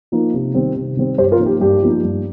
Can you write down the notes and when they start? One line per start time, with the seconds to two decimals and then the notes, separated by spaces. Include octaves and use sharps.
0.12 F3 A#3 D#4
0.34 C3
0.54 D#3 G3 C4
0.76 C3
0.97 D#3 G3 C4
1.18 G2 G4 C5
1.32 F4 A#4
1.39 F3 A#3 D#4
1.46 G4
1.60 G2 G4
1.82 F3 A#3 D#4
2.04 G2